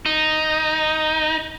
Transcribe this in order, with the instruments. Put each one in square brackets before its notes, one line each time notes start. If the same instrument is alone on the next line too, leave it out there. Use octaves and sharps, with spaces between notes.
[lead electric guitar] D#4